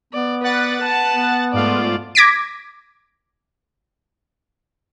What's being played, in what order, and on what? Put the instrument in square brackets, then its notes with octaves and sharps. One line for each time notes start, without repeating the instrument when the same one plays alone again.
[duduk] B3 [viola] D5
[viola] B4 D5 [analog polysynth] F#5 F#6 A6
[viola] B4 A5
[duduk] B3
[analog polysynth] G#2 F4 [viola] A3 D5
[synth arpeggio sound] D6 G#6 A#6 B6 D7